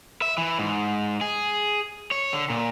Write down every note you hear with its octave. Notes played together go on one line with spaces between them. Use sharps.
E5
E3
G#2
G#4
C#5
D3
A#2